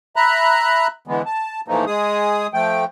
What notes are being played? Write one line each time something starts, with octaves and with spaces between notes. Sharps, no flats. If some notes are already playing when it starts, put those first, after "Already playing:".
E5 A#5 B5 F#6
D3 E3 G#3 B3
A5
A#2 E3 F3 A3 A#3 D#4
G#3 G#4 D#6
F3 A3 G5